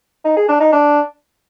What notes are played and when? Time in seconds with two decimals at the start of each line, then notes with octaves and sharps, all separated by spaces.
0.25 D#4
0.36 G#4
0.48 D4
0.60 D#4
0.72 D4